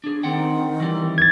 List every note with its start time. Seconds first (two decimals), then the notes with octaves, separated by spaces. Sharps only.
0.04 D4 G#4
0.23 D#3 C4 F#5 G5
0.80 E3 G3
1.18 G#6 A6